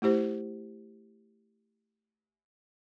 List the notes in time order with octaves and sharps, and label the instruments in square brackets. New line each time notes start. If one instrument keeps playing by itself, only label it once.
[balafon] A3 E4 G4 C5